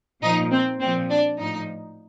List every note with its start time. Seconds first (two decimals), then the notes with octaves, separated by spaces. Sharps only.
0.23 A#2 F3 D#4
0.52 C4
0.80 A#2 C4
0.85 F3
1.10 D4
1.39 A2 F3 D#4